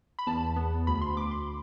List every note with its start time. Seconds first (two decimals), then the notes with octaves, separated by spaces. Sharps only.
0.19 B5
0.27 E2 A5
0.56 B3
0.87 D2 B5
1.01 C6
1.17 D2 D6
1.31 C6